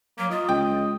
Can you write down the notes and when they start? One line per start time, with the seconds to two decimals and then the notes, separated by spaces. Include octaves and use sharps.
0.19 F#3 A#3
0.31 F4 D#5
0.49 C#2 D#5 G5